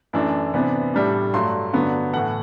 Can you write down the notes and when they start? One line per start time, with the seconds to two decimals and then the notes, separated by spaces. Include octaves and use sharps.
0.13 F#2 E3 A3 D4
0.54 C3 E3 B3 D4
0.94 A2 G3 D4
1.34 G2 F#3 A3 C6
1.73 G2 D3 F#3 B3
2.13 A2 E3 A3 F#5